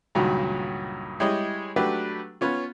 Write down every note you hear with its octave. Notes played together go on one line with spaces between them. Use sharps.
C#2 G2 A#2 D#3 F#3 F#4
G3 G#3 E4 G#4 C#5 D#5
F#3 A3 D4 F#4 G4 B4
B3 C#4 F4